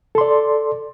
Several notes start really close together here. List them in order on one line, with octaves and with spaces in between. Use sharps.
A4 C6 D5